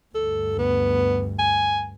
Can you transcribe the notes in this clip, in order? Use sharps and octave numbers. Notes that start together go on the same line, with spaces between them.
D2 G2 A4
B3
G#5